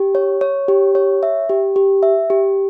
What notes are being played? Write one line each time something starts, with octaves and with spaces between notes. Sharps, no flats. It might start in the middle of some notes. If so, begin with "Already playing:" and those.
Already playing: G4
C#5
C#5
G4
C#5
E5
G4
G4
E5
G4